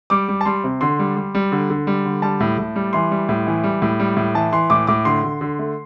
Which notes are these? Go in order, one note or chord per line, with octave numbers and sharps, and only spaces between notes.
G3 D6
G3
A5
G3 C6
C3
D3 C6
G3
G3
G3
D3
D3
G3
D3
G3 A5
A2
A2
G3
E3 C6
G3
A2
E3
G3
A2
G3
A2
E3 A5
E3 C6
A2 D6
A2 D6
D3 C6
D3
D3
A3